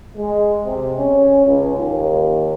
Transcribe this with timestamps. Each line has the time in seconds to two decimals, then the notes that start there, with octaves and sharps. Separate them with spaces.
0.17 G#3
0.65 C3
0.98 C#4
1.46 C#2
1.77 D#2